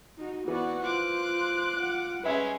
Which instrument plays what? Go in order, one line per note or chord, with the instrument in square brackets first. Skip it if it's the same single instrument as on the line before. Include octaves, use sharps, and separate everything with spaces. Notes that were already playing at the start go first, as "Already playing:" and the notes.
[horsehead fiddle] D#4 F#4
[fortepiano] E3 [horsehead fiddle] B3 [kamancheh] F#4 D5
[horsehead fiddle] F4 C5 [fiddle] D6 [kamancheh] F#6
[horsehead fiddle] F4 F#5
[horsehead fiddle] G3 [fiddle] G#3 C#4 [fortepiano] B4 E5